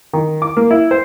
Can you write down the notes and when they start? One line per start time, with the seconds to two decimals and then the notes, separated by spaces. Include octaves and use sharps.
0.13 D#3
0.42 D6
0.57 A#3
0.71 E4
0.91 C5